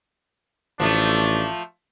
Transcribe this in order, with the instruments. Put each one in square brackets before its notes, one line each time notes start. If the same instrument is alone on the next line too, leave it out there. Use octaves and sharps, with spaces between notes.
[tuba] A1 [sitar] F3 A3 [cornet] D4